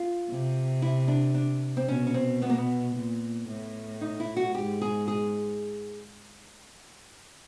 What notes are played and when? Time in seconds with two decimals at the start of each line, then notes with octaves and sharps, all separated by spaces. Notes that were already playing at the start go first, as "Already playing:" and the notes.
Already playing: F4
0.28 C3
0.82 E4
1.08 D4
1.35 D4
1.77 C4
1.88 B2 C#4
2.07 C#4
2.14 C4
2.42 B3
2.50 A#3
2.58 B3
2.95 A#2
3.49 A2
4.01 D#4
4.20 E4
4.36 F#4
4.54 G#2 G4
4.81 G#4
5.08 G#4